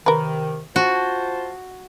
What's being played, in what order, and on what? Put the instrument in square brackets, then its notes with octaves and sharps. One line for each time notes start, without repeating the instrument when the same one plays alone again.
[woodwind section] C3 D#3 [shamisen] A#4 B4
[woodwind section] F4 C5 A5 [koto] F#4